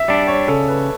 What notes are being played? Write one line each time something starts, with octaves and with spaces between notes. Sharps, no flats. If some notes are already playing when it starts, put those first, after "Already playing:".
Already playing: E5
G3 D4 D5
C#5
C#3 A4
B4